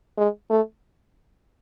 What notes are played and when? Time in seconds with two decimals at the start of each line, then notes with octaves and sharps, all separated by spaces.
0.18 G#3
0.50 A3